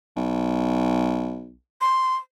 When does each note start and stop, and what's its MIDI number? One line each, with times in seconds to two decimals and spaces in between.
0.16 1.54 35
1.81 2.15 84